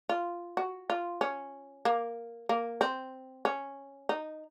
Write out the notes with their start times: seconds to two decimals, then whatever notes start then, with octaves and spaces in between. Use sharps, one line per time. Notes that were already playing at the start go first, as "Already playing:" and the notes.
0.09 F4
0.57 F#4
0.90 F4
1.21 C#4
1.85 A#3
2.49 A#3
2.81 C4
3.45 C#4
4.09 D#4